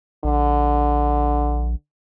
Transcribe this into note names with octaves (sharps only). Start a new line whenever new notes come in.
A#1 D3